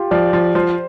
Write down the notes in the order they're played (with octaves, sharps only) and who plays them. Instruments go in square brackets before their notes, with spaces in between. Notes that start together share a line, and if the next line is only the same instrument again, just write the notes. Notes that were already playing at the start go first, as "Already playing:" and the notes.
Already playing: [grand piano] F4 G4 G5
[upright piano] F3 [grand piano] D5
[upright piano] F3
[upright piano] F3 [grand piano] C5